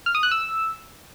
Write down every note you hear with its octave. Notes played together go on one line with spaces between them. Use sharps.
F6
D#6
F#6
E6